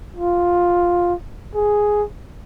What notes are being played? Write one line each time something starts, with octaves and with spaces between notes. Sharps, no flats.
F4
G#4